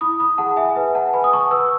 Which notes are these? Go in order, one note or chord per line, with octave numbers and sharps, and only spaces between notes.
E4 B5 D#6
B5 D#6
G#4 F#5 A5
E5 G#5
B4 E5 G#5
F#5 A5
B4 G#5 B5
D#6
A5 C#6
B4 C#6 E6